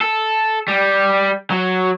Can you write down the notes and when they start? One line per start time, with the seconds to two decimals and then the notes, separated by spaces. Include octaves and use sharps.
0.01 A4
0.68 G3
1.51 F#3